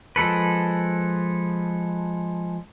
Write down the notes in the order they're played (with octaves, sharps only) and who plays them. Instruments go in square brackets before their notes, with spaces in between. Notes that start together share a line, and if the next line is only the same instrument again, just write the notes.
[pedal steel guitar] F3 G#3 A4 B4